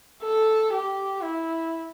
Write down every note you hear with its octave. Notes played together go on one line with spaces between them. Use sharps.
A4
G4
E4